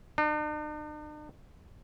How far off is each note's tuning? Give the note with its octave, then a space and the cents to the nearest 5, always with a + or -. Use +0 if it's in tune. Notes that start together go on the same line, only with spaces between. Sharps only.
D4 +45